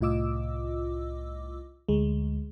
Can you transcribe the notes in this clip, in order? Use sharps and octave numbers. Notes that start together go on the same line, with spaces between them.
C2 A2 F4 D#5 D6 E6
D2 G#3